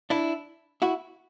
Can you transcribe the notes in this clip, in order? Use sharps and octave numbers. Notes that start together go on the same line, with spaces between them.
D4 E4
E4 F#4